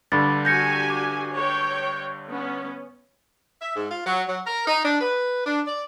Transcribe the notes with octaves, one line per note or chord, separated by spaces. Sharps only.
G2 D3 B5 D6 A6
F#4 G4 G#5 G6 A#6 C#7
D6
C#5 G5
B3 C#4
E5
G#2
F4
F#3
F#3
A#4
D#4
D4
B4
D4
D5